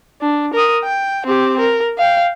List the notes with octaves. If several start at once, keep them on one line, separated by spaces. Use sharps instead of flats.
D4
A#4 D#6
G5
C4 G4
A#4
F5 G5